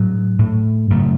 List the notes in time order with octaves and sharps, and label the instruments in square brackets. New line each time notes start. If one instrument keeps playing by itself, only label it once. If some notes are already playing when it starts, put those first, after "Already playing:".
Already playing: [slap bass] A2 F#3
A2
F#2 C#3 A3